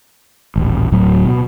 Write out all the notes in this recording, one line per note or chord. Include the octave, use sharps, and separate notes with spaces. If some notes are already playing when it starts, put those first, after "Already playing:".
D#1 A1
D1 A2 F#3
B2